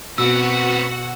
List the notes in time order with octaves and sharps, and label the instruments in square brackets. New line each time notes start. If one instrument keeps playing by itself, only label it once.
[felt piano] B2 [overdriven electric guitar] B3 C4 [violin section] F#4 F#5 [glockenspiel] E6